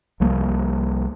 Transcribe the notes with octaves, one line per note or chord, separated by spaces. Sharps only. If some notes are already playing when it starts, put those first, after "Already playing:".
C2 F3 G3 A#3